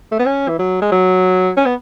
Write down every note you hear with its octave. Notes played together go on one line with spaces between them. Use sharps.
A3
B3
C#4
E3
F#3
G#3
F#3
C#4
B3